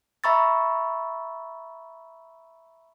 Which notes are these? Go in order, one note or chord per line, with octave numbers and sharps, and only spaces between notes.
E5 A#5 B5 C#6 E6 A6